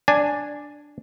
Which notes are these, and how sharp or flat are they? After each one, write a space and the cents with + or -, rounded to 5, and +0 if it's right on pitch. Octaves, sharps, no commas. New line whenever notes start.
D4 +0 G#5 +0